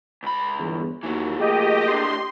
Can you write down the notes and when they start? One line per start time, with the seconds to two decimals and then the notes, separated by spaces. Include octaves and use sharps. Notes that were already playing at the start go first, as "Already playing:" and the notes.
0.23 C#2 B5
0.58 G1 E2
1.03 D#2 E3 F#3
1.40 A3 A#3 G4 G#4 D#5
1.88 A2 D4 C6